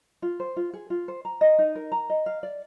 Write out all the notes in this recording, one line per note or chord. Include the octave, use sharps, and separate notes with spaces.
F4
C5
F4
G#4
F4
C5
A#5
D#5
D#4
A#4
A#5
D#5
F5
D5